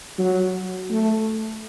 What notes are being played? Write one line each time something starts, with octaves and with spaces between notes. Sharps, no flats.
F#3
A3